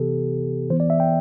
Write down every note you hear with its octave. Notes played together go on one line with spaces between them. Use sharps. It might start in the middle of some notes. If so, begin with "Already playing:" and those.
Already playing: C3 E3 B3 G4 A4
E3 B3 C5
D5
E5
G5